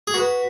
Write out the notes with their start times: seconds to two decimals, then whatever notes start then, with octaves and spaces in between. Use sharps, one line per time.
0.07 G#4
0.14 F#4 B4